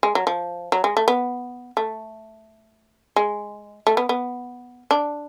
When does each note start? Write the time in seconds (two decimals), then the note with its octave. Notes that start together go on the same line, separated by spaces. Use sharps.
0.03 G#3
0.15 F#3
0.27 F3
0.72 F#3
0.84 G#3
0.97 A3
1.08 B3
1.77 A3
3.16 G#3
3.87 A3
3.97 B3
4.09 B3
4.91 D4